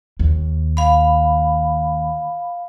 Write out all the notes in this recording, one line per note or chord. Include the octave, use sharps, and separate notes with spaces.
D#2
F5 B5